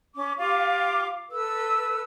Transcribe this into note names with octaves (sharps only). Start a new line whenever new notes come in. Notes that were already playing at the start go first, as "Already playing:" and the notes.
C#4 D6
F4 G4 F5 D6
A4 B4 E6